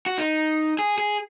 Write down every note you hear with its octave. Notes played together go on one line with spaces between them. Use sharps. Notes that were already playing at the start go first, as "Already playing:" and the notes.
F#4
D#4
G#4
G#4